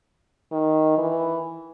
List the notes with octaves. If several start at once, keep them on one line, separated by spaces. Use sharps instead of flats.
D#3
E3